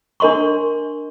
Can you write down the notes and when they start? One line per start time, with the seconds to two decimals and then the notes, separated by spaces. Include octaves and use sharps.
0.20 D4 A#4 D#5 C6 C#6